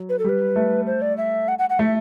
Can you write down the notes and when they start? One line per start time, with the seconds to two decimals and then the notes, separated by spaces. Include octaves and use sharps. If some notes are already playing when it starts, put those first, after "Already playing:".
Already playing: F#3
0.09 B4
0.19 A4
0.24 G3 B4
0.56 A3
0.87 C5
1.02 D5
1.18 E5
1.48 F#5
1.59 F#5
1.70 F#5
1.79 A3 E5